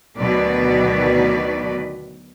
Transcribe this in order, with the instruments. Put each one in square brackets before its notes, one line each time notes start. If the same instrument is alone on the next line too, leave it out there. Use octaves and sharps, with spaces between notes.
[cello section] D2 B2 D#3 F#3 B4 D5